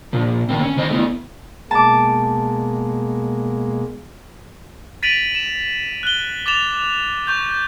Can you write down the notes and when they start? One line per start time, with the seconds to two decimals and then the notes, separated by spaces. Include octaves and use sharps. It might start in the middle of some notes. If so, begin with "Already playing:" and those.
0.13 A#2 F3
0.49 D#3 A#3 C4
0.63 C#4
0.76 D3 D#3 C5 D#5
0.90 A3 B3 E4
1.71 B2 G#3 A#3 A5 D6
5.03 A6 B6 D7 D#7 F7 F#7
5.35 E7
6.03 F#6 G7
6.46 D6 A6 E7 F7
7.26 C#6 G6 F7